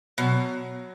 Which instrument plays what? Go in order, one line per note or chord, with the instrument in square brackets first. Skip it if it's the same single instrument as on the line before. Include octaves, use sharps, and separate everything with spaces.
[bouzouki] B2 [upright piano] F#3